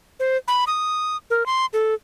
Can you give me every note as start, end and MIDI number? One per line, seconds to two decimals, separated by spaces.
0.20 0.37 72
0.48 0.65 83
0.67 1.17 87
1.30 1.46 70
1.46 1.66 84
1.73 1.94 69